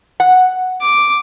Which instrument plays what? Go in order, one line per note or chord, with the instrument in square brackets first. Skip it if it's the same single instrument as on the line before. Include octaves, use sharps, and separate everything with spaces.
[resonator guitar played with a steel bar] F#5
[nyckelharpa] D6